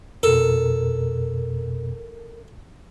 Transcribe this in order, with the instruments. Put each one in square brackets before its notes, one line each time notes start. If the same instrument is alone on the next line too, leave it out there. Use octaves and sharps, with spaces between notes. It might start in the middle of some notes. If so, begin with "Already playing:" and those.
[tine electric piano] F2 B2 [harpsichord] A4 [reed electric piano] A#4